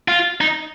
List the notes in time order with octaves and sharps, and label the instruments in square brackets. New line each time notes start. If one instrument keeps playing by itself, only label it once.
[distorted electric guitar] F4
D#4